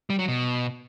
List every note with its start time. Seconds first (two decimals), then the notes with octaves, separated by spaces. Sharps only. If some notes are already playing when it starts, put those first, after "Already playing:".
0.10 G3
0.19 F#3
0.28 B2